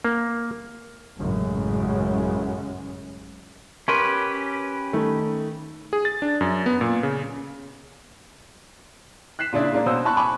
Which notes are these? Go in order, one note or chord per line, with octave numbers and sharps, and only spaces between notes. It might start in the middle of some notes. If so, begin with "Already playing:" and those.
A#3
A1 F#2 C#3 G#3
C#4 G4 A#4 B4 C6 C#6
D#3 A3
G#4
A6
D4
F#2
B3
A#2
C#3
F#6 B6 C7 E7
A#2 C#3 D4 E4
G#3 A#3 D4
B2 C#4 C5 E6
A5 B5 C#6 F#6
G#5 A5 B5 C#6 D6